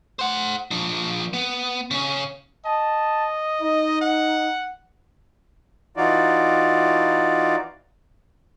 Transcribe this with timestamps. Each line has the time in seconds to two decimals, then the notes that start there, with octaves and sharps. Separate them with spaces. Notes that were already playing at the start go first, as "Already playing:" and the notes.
0.19 C5 F#5
0.71 F3 D4
1.33 B3
1.91 C#3 C#4
2.66 D#5 A5
3.61 D#4
4.01 F#5
5.97 E3 D#4 F4 F#4 D5